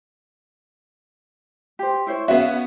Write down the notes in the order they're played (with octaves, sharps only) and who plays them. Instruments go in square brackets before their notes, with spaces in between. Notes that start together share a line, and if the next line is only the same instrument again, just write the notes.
[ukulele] G4 C5
E4 C5 C#5
[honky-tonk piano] B3 C#4 F#4 [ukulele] E5 F5